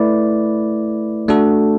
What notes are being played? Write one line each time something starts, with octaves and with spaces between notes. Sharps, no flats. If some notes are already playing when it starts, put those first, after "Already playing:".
Already playing: A3 E4 B4 D5
A3 D4 F#4 A4